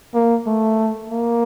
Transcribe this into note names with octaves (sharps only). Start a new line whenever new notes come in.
A#3
A3
A#3